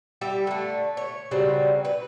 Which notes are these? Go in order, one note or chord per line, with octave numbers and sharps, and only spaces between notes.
G3 G4 E5
D3 A3
C#5
C#3 F#3 G3 C4
B4